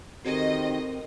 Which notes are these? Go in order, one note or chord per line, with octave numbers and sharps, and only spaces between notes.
D#3 C4 F#4 G4 A4 D#5